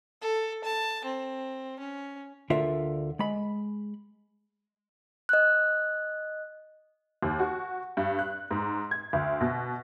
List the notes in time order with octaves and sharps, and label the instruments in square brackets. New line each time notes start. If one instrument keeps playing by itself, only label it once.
[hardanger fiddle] A4
A5
C4
C#4
[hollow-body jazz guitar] D2 D3 F4 A#4 E5
G#3 B5
[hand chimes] D#5 F#6
[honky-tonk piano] D#2
F#4
G2
F#6
G#2
G#6
D2
B2